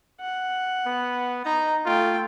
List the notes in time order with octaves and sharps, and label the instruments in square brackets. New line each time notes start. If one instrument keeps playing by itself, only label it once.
[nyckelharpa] F#5
[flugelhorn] B3
[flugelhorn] D#4 [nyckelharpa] A#5
[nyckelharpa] A3 G5 [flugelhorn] F4